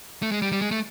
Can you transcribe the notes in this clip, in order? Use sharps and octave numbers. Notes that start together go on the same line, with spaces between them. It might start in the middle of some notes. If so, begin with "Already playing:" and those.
A3
G#3
G3
G3
G#3
A3